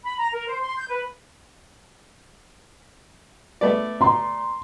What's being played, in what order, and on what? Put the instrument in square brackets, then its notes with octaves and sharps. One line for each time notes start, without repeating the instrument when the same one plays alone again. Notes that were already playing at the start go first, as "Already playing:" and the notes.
[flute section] B5
A#5
A#4
C5
C6
G6
B4
[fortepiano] A3 B3 D5
[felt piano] A#5 C6